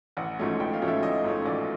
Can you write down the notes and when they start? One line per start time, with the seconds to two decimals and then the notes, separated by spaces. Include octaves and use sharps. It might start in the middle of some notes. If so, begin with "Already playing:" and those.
0.17 A1 F#5
0.39 G#2 F3 A3 C#4
0.60 A1 G5
0.73 F5
0.81 G#2 F3 A3 C#4
0.88 E5
1.03 A1 D#5
1.24 G#2 F3 A3 C#4
1.46 A1 D5